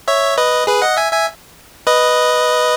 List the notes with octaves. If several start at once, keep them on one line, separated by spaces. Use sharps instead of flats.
C#5 E5
B4 D#5
G#4 B4
D#5 F#5
E5 G#5
E5 G#5
B4 D#5